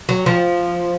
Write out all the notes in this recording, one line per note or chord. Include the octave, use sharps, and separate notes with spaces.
F#3
F3